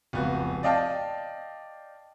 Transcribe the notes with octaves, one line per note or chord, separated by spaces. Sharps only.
F1 C#2 B3 F#4
D5 D#5 F5 G5 A5